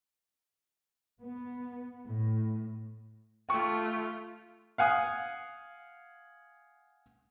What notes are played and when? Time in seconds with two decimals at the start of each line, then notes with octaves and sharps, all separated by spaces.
1.21 B3
2.06 A2
3.49 A3 F4 G5 C#6
4.78 F5 F#5 G#5 D#6